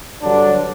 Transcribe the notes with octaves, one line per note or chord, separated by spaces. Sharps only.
G2 D3 F#3 D4